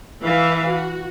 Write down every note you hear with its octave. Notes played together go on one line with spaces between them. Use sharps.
E3 E5 F5
F#4